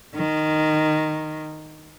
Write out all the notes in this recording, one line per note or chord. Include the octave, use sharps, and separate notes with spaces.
D#3